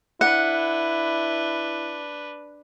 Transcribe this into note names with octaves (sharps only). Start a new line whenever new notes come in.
D4 E4 B4 F#5